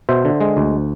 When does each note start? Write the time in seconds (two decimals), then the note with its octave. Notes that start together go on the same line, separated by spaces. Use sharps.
0.09 B2 C5 E5
0.25 D3
0.41 G#3
0.57 D2